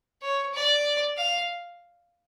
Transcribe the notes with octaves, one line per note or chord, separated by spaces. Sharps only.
C#5
D5
F5